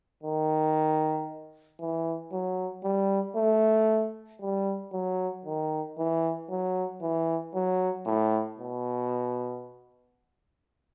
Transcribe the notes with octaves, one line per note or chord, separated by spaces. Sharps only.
D#3
E3
F#3
G3
A3
G3
F#3
D#3
E3
F#3
E3
F#3
A2
B2